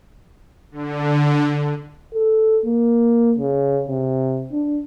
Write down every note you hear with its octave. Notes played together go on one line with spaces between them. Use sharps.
D3
A4
A#3
C#3
C3
D4